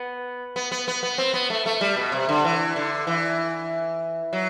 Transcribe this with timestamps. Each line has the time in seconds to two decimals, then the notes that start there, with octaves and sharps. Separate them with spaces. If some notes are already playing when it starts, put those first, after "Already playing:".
Already playing: B3
0.56 B3
0.72 B3
0.88 B3
1.03 B3
1.18 C4
1.34 B3
1.50 A3
1.66 A3
1.81 G3
1.97 B2
2.12 C3
2.29 D3
2.44 E3
2.76 D3
3.07 E3
4.33 F#3